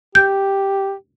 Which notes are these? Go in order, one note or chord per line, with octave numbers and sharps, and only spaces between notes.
G4 G6